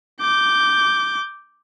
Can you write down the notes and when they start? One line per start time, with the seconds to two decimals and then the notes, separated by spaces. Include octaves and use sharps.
0.22 D6 G6